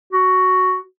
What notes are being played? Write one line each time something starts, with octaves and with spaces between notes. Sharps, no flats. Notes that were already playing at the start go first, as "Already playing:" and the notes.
F#4